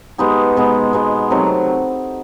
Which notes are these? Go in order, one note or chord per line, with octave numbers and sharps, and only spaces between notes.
G#3 B3 D#4 G4
B2 G#3 B3
B2 G#3 B3
C3 D#3 F#3 A3